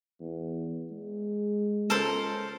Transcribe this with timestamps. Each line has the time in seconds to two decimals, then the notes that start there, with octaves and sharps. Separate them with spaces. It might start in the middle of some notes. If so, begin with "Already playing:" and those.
0.20 E2
0.91 G#3
1.90 C#2 A4 A#4 C5